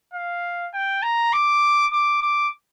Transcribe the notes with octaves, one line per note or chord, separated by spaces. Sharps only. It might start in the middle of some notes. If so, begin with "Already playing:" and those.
F5
G5
A#5
D6
D6
D6